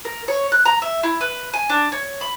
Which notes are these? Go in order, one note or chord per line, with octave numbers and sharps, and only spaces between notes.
A#4
C#5
F#6
A#5
E5
E4
B4
G#5
D4
C#5
B5